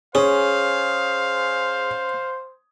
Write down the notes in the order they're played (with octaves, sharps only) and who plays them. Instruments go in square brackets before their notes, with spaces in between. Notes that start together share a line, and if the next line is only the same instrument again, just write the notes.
[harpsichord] C#4 [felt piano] G#4 [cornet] C5 [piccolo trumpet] F5